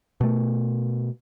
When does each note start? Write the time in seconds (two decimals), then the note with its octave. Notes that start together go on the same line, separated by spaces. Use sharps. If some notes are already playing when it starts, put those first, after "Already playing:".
0.21 B2 A3